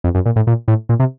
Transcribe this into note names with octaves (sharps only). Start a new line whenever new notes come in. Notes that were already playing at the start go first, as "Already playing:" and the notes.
F2
F#2
A#2
A2
A#2
A2
A#2
C3